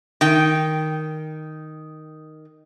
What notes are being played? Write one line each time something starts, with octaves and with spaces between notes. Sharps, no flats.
D#3 G5